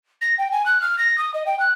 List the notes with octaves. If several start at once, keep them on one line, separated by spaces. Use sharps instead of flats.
A#6
G5
G#5
F#6
F6
A#6
D#6
D#5
G5
F#6